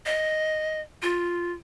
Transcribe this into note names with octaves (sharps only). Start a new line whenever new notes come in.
D#5
F4